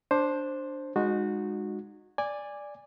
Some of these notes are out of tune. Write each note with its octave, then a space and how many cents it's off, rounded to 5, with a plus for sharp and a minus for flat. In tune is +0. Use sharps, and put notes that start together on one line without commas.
D4 +0 C5 +10
G#3 -10 D#4 -30 F#4 -15
D5 +0 G#5 -15